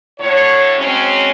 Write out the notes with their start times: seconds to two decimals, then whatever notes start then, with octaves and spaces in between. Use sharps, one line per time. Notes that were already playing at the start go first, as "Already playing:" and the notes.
0.19 A2 D3 C#5
0.78 F#3 G#3 C4 C#4